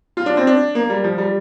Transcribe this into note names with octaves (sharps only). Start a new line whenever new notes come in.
F4
D4
C4
D4
A#3
G3
F3
G3